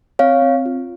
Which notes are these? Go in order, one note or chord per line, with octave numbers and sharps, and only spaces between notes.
C4 C#5 F5
C4
F4